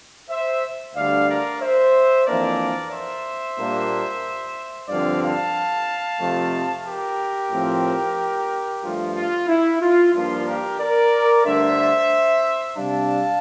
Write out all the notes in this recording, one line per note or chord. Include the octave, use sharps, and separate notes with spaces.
C5 E5
D2 D3 G3 D4 D5 F5
A#4 D5
C5 E5
F2 E3 A#3 D4 A#4 D5
C5 E5
A#2 G3 A#3 D4
G2 D3 F3 C4 D5 F5
F5 A5
F2 C3 F3 A3
G4 A#4
A2 F3 C4
G2 F3 A3 F4
F4
E4
F4
G2 F3 A#3 D4 F4
G4 A#4
A#4 D5
G2 D3 A3 D4 C5 E5
C3 G3 D4 F5 A5